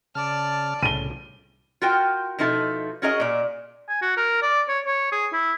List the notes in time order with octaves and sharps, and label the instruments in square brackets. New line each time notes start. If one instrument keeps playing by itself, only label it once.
[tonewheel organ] C#3 F6 [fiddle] D5 A5
[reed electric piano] C2 [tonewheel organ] A2 C#3 [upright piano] D#7 G7
[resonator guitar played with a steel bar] F4 F#4 A#4 G5
B2 F3 D#4 E4 A4
C#4 F#4 G#4 A#4 D#5
A#2 D5
[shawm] G#5
F#4
A#4
D5
C#5
C#5
G#4
E4